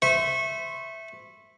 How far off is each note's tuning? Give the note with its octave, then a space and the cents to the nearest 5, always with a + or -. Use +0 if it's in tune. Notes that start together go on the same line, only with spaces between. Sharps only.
C5 -25 E5 +0 C#6 -25